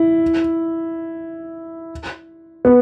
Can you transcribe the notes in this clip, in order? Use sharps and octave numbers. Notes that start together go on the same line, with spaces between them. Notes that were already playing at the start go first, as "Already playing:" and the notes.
Already playing: E4
B3